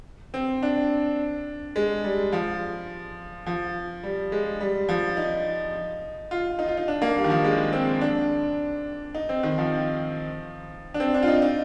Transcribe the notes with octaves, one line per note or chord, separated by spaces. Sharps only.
C4
D4
G#3
G3
F3
F3
G3
G#3
G3
F3
D#4
F4
D#4
F4
D#4
D4
A#3
G3
D#3
F3
G#3
C4
D4
D#4
C4
D#3
F3
D4
C4
D4
F4
D#4
D#4